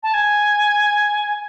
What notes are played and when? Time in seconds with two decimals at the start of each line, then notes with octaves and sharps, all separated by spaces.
0.03 A5
0.14 G#5